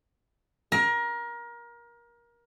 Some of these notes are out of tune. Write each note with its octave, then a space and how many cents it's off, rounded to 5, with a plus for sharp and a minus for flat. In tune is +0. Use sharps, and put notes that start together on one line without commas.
A#4 +25